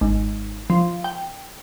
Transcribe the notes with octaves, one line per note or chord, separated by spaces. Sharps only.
G#1
F3
G5